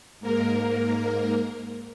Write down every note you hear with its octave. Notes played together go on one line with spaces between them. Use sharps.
G#2 A#3 A#4